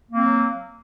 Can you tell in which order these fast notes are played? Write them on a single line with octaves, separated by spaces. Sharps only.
A#3 C4 F#3